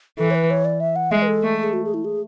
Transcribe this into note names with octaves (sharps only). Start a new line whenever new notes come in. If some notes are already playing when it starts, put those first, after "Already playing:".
E3 A4
C#5
B4
C#5
D5
E5
F#5
G#3 E5
B4
A4
A3
A4
G#4
F#4
G#4
E4
G#4